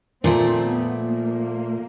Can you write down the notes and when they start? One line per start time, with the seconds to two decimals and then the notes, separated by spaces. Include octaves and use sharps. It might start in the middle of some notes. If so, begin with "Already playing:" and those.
0.24 A#2 F3 A3 C4
0.63 B3
1.00 A#3